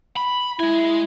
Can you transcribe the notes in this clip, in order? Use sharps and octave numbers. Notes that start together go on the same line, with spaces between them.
B5
G#3 E4 G#5